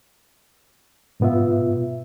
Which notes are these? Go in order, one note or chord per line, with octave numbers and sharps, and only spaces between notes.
G#2 B2 B3 F4 E5